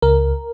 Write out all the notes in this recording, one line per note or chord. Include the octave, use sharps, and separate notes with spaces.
C#2 A#4